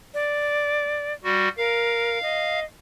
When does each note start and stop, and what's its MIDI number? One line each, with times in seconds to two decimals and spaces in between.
0.14 1.13 74
1.24 1.49 55
1.24 1.49 66
1.57 2.21 70
1.57 2.59 77
2.22 2.64 75